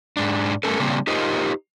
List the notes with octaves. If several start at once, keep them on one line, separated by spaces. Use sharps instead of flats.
G#2 D4
G2 E3 A3 C#4 A4 A#4
C#3 G3 A#3 C4 D4
D#4 F4 G4 A#4 C5 D#5